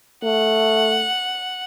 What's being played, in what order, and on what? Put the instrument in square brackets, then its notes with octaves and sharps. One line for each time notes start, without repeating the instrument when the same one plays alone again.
[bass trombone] A3 [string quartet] F#5